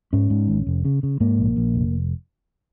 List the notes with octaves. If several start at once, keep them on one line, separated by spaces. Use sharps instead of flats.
G#2 C#4
G#2
G#1
F1
C#3
C#3
G#2 A#3
A#1
A#1
F1